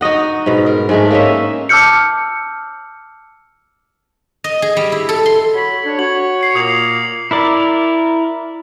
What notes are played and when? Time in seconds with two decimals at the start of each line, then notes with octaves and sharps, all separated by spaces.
0.01 D#4 F#4 D#5 F#5
0.46 G#2 B2
0.66 A#4
0.89 G#2 G#3 A3
1.11 A#3 C#4 D#4 E5
1.69 A5 D6 E6 F6 G6 C#7
4.44 D#5
4.62 G#4
4.77 G3
4.92 E4
5.09 A4
5.26 C6
5.54 F#4 C#5 B5
5.86 D4 C#5
5.99 F#4 C#5 F#7
6.41 C7 C#7
6.55 A#2 A#3 D#6 C7 F7
7.31 E4 A#4 D5